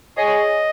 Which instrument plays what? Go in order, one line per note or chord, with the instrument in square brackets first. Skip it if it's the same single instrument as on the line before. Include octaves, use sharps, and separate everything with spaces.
[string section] G#4 C#5 [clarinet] D#5